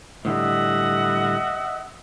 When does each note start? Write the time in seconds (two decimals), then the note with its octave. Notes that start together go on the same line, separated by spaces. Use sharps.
0.25 A2 D3 G3 D#5 E5 F#5